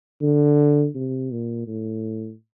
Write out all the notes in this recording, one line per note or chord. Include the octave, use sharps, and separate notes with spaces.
D3
C3
A#2
A2